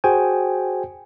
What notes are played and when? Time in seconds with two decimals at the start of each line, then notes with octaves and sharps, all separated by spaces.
0.04 F#4 G#4 C5 G5 G#5